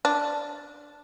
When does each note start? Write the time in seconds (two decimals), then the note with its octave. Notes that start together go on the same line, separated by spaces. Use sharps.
0.05 D4